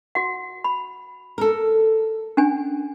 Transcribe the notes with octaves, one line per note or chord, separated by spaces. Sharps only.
F#4 F#5
B5
A4 A#4
C#4 D4 G#5